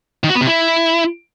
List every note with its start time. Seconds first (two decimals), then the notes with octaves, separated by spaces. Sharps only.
0.24 D#3
0.29 F#4
0.35 B3
0.41 C3
0.47 E4